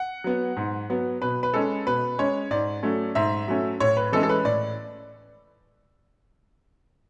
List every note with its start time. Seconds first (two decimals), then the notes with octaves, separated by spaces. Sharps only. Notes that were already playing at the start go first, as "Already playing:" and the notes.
Already playing: F#5
0.24 F#3 B3
0.57 G#2
0.90 F#3 B3
1.22 B2 B4
1.43 B4
1.54 G#3 C#4 A4
1.86 B2 B4
2.18 G#3 C#4 C#5
2.51 G#2 D5
2.83 F#3 A3 C#4
3.15 G#2 E5
3.48 F#3 A3 C#4
3.80 A2 C#5
3.97 B4
4.12 E3 G#3 C#4 A4
4.23 A4
4.29 B4
4.45 A2 D5